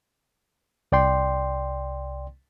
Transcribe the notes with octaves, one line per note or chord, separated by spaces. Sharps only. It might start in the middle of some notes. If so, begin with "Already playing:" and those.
C2 D5 G5 C6